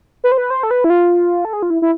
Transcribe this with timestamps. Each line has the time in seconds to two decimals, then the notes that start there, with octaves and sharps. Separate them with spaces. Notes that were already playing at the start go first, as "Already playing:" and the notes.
0.24 B4
0.32 C5
0.38 B4
0.50 C5
0.63 A4
0.71 B4
0.84 E4
0.90 F4
1.45 A4
1.53 G#4
1.63 F4
1.70 E4
1.82 E4